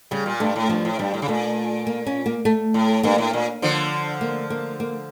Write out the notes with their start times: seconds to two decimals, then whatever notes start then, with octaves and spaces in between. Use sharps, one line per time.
0.11 C#3 G3
0.26 A#2
0.40 G2 A3
0.56 A2
0.69 G2 F3
0.85 A2
0.99 G2 G3
1.14 A2
1.22 C#3
1.28 A#2 A3
1.87 A#3
2.07 C#4
2.26 A#3
2.45 A3
2.74 A2
3.03 G2 A#3
3.18 A2
3.33 A#2
3.62 D3 F3
4.21 A#3
4.50 A#3
4.80 A#3